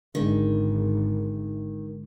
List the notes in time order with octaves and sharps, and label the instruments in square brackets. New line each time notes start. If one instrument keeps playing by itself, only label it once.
[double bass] G#1 [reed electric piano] D3 G#3 [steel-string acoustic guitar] D#3